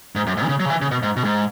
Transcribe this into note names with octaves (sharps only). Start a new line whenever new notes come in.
G#2
F#2
G#2
E3
C#3
F#3
C#3
E3
C#3
B2
G#2
B2
G#2